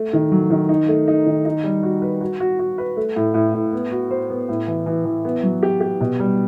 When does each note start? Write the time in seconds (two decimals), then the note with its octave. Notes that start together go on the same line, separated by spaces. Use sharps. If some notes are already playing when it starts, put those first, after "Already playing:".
Already playing: A3
0.13 D#3
0.32 F#3
0.50 D#3
0.69 D#4
0.88 A3
1.08 D#4
1.26 D#3
1.45 D#4
1.64 G3
1.83 F#4
2.02 B4
2.21 F#4
2.40 F#4
2.59 F#4
2.78 B4
2.97 A3
3.16 A2
3.34 A2
3.54 A2
3.73 B3
3.91 F#4
4.11 C5
4.30 B3
4.49 A2
4.67 E3
4.86 E3
5.05 E3
5.25 B3
5.43 F#3
5.63 G4
5.81 G4
6.00 B2
6.19 G3